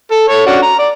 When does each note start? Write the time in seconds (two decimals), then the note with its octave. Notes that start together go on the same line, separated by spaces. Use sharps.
0.11 A4
0.29 A4 C#5
0.46 C#4 D4 F#4
0.62 A#5
0.79 D5